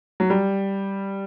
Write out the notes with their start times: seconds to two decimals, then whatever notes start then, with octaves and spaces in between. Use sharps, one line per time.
0.20 F#3
0.30 G3